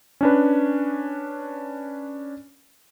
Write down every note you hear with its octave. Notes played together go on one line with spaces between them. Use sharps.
C#4 D4 B4